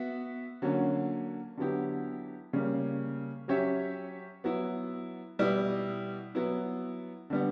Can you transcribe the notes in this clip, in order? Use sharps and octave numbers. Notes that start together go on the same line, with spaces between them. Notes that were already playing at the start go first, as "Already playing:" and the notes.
Already playing: B3 F#4 E5
D3 F#3 A#3 C#4
D3 F#3 B3 E4 G4
C#3 G3 A#3
F#3 C#4 G4 C#5 E5
F#3 B3 E4
B2 G3 B3 E4
F#3 B3 E4
D3 G3 B3